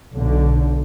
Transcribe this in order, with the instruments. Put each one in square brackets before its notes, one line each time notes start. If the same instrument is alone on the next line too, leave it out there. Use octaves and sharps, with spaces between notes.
[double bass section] B1 D3